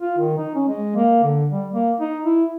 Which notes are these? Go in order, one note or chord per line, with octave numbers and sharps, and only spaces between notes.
F4
D#3
D#4
C#4
G#3
A#3
D3
G3
A#3
D#4
E4